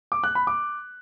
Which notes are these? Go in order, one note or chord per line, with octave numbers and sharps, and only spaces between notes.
D6
F#6
B5
D6